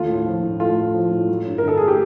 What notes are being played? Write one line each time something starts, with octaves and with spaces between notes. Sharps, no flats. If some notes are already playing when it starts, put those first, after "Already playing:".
Already playing: D#2 A3 F4
A2
F3
A2
A3 F4
A2
F3
A2
F#3
G2
D3 A#4
A4
A3 G#4
G4